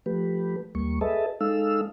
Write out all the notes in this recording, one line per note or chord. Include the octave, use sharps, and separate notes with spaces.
F3 A3 G4 B4
D#2 G3 A#3 C#6
G#4 A4 B4 D#5 E5 A5
G#3 D#4 A4 F5 E6